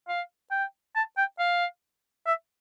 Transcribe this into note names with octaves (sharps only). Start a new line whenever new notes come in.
F5
G5
A5
G5
F5
E5